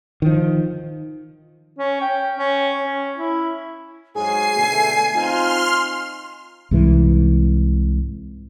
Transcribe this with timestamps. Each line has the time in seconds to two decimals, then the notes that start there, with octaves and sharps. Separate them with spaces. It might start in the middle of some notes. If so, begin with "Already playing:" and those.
0.22 D#3 F3
1.79 C#4
2.01 G5
2.37 C#4
2.84 C#4
3.17 E4
4.15 G#2 F#3 G#4 G#5 C7
4.56 B2 D3 A3
5.15 C4 D#4 F4 C6 F6
6.71 C2 G#2 E3